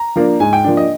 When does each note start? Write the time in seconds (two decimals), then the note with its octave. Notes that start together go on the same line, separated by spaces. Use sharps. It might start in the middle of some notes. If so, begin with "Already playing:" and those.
Already playing: A#5
0.16 F3 A#3 D4
0.40 G#2 G#5
0.53 G5
0.64 F3 A#3 D4
0.77 D#5